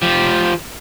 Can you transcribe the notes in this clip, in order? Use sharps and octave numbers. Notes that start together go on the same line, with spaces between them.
F3 G4